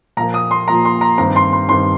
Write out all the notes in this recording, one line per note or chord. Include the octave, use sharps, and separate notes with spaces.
A#2 F3 A#3 A#5
D#6
C6
A#2 F3 A#3 A#5
C6
A#5
G2 D#3 C4 A#5
C6
C6
G2 D#3 C4 C6